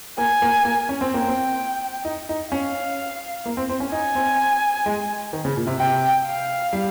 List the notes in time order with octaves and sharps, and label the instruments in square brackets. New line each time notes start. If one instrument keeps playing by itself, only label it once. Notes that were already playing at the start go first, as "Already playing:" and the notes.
[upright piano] A#3 [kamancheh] G#5
[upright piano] A#3
A#3
C#4
C4
[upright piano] A#3 [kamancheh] G5
[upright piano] C4
D#4
D#4
[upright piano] C#4 [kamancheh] F5
[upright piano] A#3
C4
C4
C#4
[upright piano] D#4 [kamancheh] G#5
[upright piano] C4
G#3
D#3
C#3
A#2
C3
[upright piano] C3 [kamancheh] G5
[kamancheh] F5
[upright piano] G3